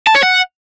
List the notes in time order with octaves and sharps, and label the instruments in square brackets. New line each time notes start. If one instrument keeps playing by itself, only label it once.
[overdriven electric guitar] A5
C#5
F#5